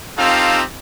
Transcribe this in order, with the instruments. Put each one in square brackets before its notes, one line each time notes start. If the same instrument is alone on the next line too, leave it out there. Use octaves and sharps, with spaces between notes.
[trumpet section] C4 D#4 F4 G4 A4 F5